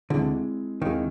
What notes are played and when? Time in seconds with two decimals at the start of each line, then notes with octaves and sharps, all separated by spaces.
0.10 D2 D3 G#3 C4 E4 G#4
0.81 D#2 D#3 G#3 C4 E4 G#4